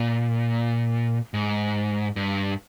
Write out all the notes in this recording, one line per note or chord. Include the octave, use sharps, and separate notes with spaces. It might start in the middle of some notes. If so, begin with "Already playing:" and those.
Already playing: A#2
G#2
G2